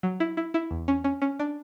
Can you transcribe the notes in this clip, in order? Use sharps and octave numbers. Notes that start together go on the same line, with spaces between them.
F#3
E4
E4
E4
E2
C#4
C#4
C#4
D4